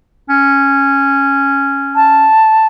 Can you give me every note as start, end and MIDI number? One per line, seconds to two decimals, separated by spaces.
0.29 2.29 61
1.95 2.67 81